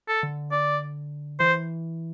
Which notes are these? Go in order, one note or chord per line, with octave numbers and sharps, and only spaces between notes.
A4
D3
D5
E3 C5